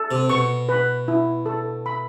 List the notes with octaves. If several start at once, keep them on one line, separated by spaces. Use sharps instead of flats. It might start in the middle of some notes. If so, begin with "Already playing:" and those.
Already playing: A4
C3
B2 C#6
B4
E4
A4
B5